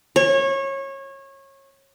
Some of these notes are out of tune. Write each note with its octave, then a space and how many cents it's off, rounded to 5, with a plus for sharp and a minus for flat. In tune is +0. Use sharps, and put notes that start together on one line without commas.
C#5 -25